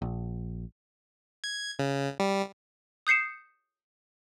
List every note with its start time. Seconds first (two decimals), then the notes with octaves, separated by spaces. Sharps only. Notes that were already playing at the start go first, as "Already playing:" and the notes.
0.02 A#1
1.44 G#6
1.79 C#3
2.20 G3
3.07 D#6 G6 C7 C#7 E7